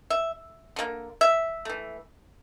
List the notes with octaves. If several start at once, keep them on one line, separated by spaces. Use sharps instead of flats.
E5
D3 G3 A#3
E5
E3 A3